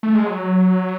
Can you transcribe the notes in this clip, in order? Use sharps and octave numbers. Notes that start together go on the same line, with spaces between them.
A3
G#3
F#3